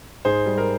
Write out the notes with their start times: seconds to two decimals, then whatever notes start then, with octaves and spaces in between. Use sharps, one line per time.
0.25 G#2 G#4 C5
0.46 G3
0.58 A#4